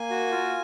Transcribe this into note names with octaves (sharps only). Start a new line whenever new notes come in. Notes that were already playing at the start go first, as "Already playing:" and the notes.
Already playing: A#3 G#5
F#4
F4